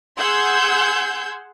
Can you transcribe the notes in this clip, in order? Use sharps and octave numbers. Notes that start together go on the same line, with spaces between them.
G#4 F#5 C6 E6 G6 G#6